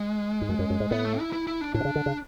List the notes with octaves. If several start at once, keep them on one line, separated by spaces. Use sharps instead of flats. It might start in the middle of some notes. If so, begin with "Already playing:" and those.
Already playing: G#3
G#2
F#2
F#2
F#2
G#2
A2 B3
A3
E4
E4
E4
D4
A2 D4
B2
C#3
D3
C#3